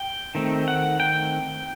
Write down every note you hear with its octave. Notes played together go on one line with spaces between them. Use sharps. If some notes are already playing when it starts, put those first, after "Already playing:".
Already playing: G5
D#3 A3 C4
F#5
G5